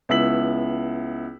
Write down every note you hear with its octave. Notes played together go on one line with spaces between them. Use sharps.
C#2 B3 E4 E6 B6 F#7